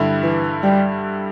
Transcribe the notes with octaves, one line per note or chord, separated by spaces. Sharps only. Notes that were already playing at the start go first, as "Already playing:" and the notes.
Already playing: G2 D3 G3 E4
E3
G3